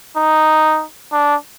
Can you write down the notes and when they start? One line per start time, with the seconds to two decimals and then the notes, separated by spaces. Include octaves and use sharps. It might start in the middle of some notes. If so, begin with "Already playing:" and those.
0.17 D#4
1.13 D4